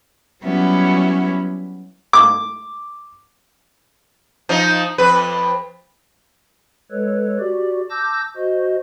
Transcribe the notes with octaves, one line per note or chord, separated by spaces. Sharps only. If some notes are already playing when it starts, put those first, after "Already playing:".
F#3 G3 B3 C#4 E4 F#4
D6
F3 D#4
F2 B4
G#3 A4 B4 C#5
F#4 G4 D5
A5 D6 E6 G6 A#6
F#4 C5 D#5